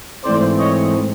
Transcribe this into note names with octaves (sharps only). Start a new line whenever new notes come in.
G#2 E3 A3 C4 C5 D5
C#5 D#5